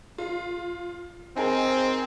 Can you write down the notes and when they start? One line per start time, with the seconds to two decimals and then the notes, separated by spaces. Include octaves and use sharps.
0.18 F4
1.36 C4 D#4 G#4 A#4